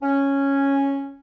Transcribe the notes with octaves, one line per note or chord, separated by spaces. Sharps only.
C#4